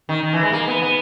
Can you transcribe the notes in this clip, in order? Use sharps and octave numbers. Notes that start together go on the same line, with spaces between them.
D#3
D#3
E3
G#3
A#3
B3
B3